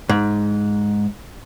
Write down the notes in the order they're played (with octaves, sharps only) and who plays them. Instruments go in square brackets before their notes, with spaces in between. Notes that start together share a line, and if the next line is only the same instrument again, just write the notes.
[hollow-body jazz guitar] G#2